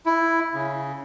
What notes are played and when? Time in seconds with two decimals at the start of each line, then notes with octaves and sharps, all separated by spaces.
0.06 E4
0.54 C#3